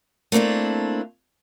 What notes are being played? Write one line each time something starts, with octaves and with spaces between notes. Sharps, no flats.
A3 A#3 C4 D4 E4